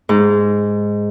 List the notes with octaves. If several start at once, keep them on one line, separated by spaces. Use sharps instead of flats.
G#2